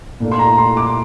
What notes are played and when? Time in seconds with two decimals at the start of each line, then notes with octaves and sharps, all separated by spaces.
0.20 A#2 A3 D4
0.32 C6
0.39 A#5
0.58 C6
0.77 D6